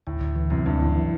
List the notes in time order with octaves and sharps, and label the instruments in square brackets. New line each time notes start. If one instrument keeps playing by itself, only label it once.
[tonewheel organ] D2 [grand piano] A2
[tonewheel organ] D2
E3
[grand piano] F#2 [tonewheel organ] C3
[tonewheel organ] D2 [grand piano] G2
[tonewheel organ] E3
E3